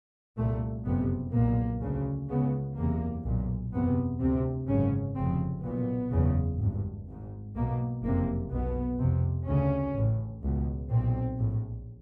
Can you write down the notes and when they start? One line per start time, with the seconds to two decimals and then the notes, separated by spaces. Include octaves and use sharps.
0.37 C2 A#2 A3
0.85 F#1 F2 C3 B3
1.33 B1 A#2 A#3
1.81 D2 C#3
2.28 C#2 C#3 B3
2.76 F#1 E2 C3 A#3
3.24 B1 A#2
3.72 F#1 E2 C3 B3
4.20 D2 C3 C4
4.67 G#1 F#2 C#3 C#4
5.16 F1 F2 C#3 C4
5.64 B1 A#2 B3
6.11 F#1 E2 C#3
6.59 G#1 G2
7.08 G#1 G#2
7.55 B1 B2 A#3
8.03 F#1 F2 C3 A#3
8.51 B1 B2 B3
8.98 F1 F2 C3
9.47 D2 C#3 C#4
9.94 A1 A2
10.42 C#2 B2
10.89 B1 A#2 C4
11.38 A#1 A2